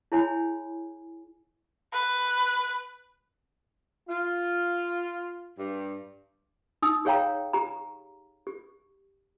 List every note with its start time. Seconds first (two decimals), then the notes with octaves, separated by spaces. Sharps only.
0.12 E4 G#4 C#5 G#5 B5
1.93 B4
4.08 F4
5.57 G2
6.82 D#4 D#6 E6
7.05 G4 G#4 C#5 F5 G5 A#5
7.53 G4 A#5
8.47 G4